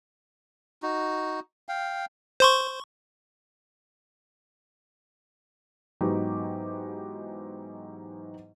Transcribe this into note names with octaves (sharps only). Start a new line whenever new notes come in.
D#4 F#4
F5 G5
C5 C6 C#6
G#2 E3 F#3 B3 D#4 G4